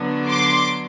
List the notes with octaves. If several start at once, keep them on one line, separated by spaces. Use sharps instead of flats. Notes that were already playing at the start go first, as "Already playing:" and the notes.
Already playing: D3 F#3 B3 D4
C6 D6